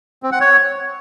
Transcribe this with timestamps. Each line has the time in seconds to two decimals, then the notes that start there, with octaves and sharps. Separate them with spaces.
0.23 C4
0.32 F#5
0.41 C#5